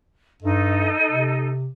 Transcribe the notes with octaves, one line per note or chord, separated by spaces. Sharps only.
G2 D#4 A4 D#5
C3